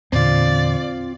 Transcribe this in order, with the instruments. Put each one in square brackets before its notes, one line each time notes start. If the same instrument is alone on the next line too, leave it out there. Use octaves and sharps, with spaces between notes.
[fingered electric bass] E2 A#2 D3 [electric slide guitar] C4 F4 [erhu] D5